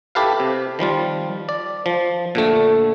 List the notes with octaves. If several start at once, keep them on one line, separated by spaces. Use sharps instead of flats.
E4 G4 A4 B4 F5
C3
D#3 F3 G3 F4
D5
F3
A#2 D3 A3